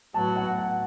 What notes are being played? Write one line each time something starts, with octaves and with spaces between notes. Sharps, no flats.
A2 F#3 B3 F#4 A5
F#5
F#5